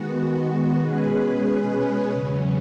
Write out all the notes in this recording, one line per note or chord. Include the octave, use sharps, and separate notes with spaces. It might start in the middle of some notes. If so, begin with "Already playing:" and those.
Already playing: D#3 G#3 B3 F#4
B2 G#3 C#4 G#4 B4
E2 C#3 F#3 C#4